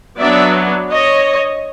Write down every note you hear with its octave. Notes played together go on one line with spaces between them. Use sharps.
F#3 B3 D4 D5 E5
C#5 D#5